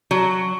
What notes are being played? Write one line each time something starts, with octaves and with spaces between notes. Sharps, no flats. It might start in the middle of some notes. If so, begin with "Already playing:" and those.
F#3